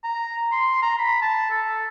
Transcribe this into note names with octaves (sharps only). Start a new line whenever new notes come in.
A#5
C6
A#5
B5
A5
A4